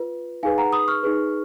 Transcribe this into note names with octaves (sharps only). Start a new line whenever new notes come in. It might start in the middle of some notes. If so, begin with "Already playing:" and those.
Already playing: F4 B4
D#4 G#4 B4 F5 G#5
F#5 A#5
B5 D#6
C#6 F6
D#4 G#4 B4